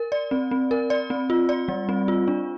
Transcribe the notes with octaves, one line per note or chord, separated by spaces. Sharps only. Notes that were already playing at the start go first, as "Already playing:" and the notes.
Already playing: A#4
D5
C4
C4
A#4
D5
C4
F4
D5
G3
C4
F4
D4